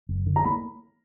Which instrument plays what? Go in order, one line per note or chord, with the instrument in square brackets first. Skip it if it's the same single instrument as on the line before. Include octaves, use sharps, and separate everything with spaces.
[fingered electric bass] F#1
D3
[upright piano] A#5
[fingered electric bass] A#3 [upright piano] B5